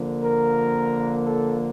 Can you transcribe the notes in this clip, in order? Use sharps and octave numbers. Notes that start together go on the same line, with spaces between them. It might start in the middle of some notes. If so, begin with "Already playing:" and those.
Already playing: D3 F3 A#3
A#4
A4